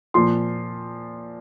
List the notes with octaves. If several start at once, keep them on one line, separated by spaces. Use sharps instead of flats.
A#2 F3 C6